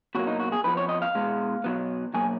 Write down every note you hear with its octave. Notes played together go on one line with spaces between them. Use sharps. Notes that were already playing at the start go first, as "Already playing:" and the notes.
B2 F#3 A#3 F#4
D#4
F#4
G#4
F2 F3 B3 B4
C#5
D#5
F5
B2 G#3 B3
B2 F#3 B3
B2 F#3 A#3 G#5